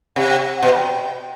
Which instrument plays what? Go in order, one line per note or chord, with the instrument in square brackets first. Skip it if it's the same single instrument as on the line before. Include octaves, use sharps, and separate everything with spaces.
[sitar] C3 [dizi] F#5
[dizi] G5
F#5
[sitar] B2 [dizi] F#5
[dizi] B5
G5